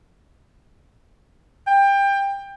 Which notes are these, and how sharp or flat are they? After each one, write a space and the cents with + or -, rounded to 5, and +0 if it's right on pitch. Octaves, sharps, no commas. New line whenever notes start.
G5 +25